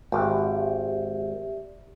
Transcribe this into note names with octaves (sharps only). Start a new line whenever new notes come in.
G#1 G4 D5 E5